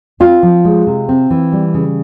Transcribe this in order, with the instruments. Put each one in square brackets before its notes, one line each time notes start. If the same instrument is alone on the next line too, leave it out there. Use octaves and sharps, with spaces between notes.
[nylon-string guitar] C4 F4
F3
G#3
C3
C4
E3
G3
C#3